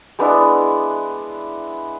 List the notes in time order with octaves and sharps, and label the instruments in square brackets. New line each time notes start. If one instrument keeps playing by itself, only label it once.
[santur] G#3 B3 D4 E4